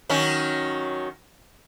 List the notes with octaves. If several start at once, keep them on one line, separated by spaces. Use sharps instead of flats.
D#3 F#3 C#4